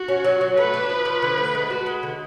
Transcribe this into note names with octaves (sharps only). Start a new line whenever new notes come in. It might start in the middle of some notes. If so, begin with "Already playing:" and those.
Already playing: F#4
C#4
F#3
F#3
A3 B4
D4
F3
F3
D3
A3
G#3
F#4
G#3
D3